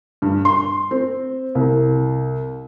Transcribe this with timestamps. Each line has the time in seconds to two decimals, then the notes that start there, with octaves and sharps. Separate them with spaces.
0.22 G2
0.45 C6
0.91 C4
1.55 C2